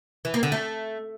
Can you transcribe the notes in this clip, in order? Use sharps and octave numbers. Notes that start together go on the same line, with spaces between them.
E3
A#3
D3
A3